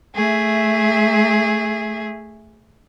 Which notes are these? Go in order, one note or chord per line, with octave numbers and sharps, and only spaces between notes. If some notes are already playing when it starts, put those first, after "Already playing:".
A3 G#4 E5